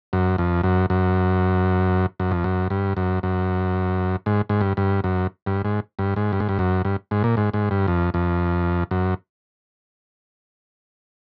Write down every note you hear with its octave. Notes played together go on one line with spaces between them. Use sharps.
F#2
F2
F#2
F#2
F#2
F2
F#2
G2
F#2
F#2
G#2
G#2
G2
G2
F#2
G2
G#2
G2
G#2
G2
G#2
G2
F#2
G2
G#2
A#2
G#2
G#2
G2
F2
F2
F#2